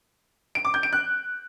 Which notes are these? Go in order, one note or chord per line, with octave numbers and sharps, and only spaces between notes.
D7
D6
G6
D7
F#6